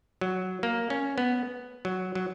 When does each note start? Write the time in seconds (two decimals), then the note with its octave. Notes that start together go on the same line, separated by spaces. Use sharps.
0.21 F#3
0.63 A#3
0.90 C#4
1.18 B3
1.85 F#3
2.15 F#3